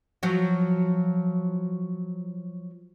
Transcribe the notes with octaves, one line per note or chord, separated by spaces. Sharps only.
F3 F#3